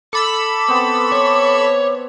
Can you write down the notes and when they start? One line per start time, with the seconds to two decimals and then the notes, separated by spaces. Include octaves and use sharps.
0.13 A4 B5 D6 E6
0.68 B3 C4
1.12 C#5